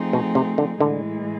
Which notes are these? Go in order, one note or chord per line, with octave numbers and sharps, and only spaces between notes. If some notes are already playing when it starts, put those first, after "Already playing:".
Already playing: F3 A3 C4 D#4 G#4
B2
C3
D3
A2 D3 E3 G#3